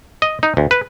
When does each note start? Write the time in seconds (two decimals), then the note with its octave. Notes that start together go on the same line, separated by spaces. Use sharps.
0.22 D#5
0.43 D#4
0.57 D2
0.71 B4